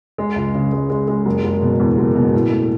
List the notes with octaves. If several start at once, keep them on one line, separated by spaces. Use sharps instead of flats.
G#3
C#2
C#3
G#3
G#3
G#3
F#1
F#1
B2
E2
F#1
B2
A2
A3